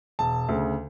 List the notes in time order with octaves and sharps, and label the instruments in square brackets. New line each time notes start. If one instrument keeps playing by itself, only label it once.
[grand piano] E1 A5
D2 C#3